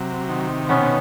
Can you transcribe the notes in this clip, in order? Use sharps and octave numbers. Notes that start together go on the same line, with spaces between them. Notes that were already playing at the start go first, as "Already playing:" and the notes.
Already playing: C3 F#3
D#3
B2 B3 C#4